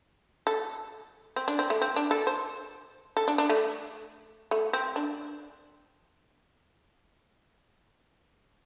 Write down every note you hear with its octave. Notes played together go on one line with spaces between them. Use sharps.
A4
C4
D4
C4
A3
C4
D4
A4
C5
A4
D4
D4
A3
A3
C4
D4